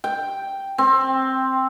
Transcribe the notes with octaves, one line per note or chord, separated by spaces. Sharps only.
G5
C4